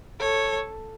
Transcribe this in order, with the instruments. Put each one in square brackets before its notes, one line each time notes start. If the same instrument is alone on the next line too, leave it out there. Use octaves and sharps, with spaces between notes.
[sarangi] A4 [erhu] C#5